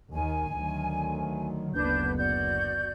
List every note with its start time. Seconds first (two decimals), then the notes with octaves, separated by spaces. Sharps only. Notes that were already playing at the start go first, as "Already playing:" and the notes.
0.12 D#2 D#3 G#5
0.52 D2 D#3 F#3
1.74 F#1 D2 B3 D4 B4 G6
2.17 F#4 D5 G6